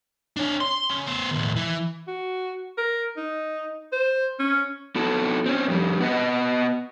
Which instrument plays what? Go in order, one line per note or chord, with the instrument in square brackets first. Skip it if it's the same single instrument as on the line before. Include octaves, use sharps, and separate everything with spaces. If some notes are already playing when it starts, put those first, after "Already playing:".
[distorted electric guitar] D4 C#5
C6
C#3
B3 C5
D#2 A2
E3
[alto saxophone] F#4
A#4
D#4
C5
C#4
[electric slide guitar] B3 F#4 A4
C4 C#4
F2 G3
B3 B4 D#5 F#5